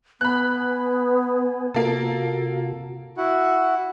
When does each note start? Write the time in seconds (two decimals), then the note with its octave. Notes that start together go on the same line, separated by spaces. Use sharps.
0.21 B3 B4 G#5 B5 F#6
1.74 C3 A#3 F4 F#4 A4
3.17 E4 F#4 F#5